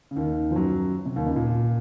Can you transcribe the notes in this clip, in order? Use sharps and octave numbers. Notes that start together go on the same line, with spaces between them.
C#3
D#2 D#3
F3
F#2 F#3
C3
D#2 D#3
C#2 C#3
A#2